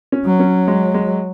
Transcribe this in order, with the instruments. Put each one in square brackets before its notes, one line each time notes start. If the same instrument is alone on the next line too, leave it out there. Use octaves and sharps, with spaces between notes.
[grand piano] C#4
[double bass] F#3
[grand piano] C#4
G#3
G#3